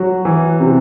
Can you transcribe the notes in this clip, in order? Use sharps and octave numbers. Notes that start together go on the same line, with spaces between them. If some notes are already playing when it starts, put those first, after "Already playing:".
Already playing: F#3 F#4
E3
C3